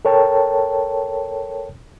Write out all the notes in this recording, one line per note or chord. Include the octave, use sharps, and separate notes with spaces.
A4 A#4 C#5 G5 A5